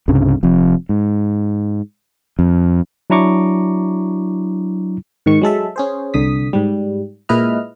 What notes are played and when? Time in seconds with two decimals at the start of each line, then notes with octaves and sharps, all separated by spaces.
0.08 C2 G2 C#3
0.43 F1 F2
0.89 G#2
2.39 F2
3.10 F#3 D4 E4 A#5 C#6 D6
5.26 G#2 D#3 C#6
5.42 F#3 G#3 A4 E5
5.76 C#4 G#4 C5
6.14 C2 D3 D#6 B6
6.53 G#2 G3
7.29 A#2 G#3 E4 B4 D#5 F6